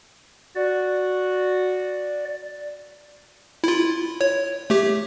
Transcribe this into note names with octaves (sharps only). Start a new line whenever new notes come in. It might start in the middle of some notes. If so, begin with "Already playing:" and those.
F#4 D5
E4 F4
C#5
A3 G4